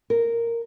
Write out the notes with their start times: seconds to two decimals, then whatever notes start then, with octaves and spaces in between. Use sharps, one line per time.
0.10 A#4